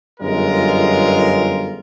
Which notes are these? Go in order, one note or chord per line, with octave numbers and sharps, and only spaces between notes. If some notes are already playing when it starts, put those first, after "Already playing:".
G1 F#2 G#3 F4 A#4